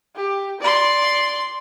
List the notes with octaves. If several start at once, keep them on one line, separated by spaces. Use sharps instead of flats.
G4
D5 C6